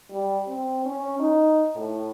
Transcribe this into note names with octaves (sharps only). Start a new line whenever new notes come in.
G3
C4
C#4
D#4
A2